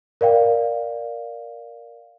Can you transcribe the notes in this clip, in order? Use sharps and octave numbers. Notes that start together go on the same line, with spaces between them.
A#4 D5 F5 G5